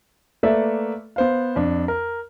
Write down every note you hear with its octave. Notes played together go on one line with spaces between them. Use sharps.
A3 A#3 A4 B4 D5 E5
B3 C5 F5
F2 D4
A#4